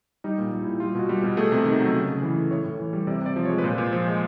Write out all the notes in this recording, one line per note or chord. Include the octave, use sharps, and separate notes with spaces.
G3 D#4
A#2
G3
A#2 E4
G3 F4
B2 F#4
G3
G4
B2
A3 G#4
C3
D#3
F#3
C#3
C#3
E3
A3
A2 C#5
A2
E3
G3
C3 D5
C3 D5
F3
G#3 C#5
B4
A#2 C5
A#2
F3
G#3